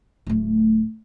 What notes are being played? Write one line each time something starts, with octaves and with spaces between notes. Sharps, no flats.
D1 A3